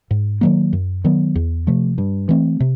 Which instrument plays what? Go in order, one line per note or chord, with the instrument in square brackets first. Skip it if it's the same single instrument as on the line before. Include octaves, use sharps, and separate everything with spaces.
[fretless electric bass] G#2
D#3 F#3 A#3
F#2
D#3 F#3 B3
E2
C3 F3 A3
G2
E3 A3 C4
C3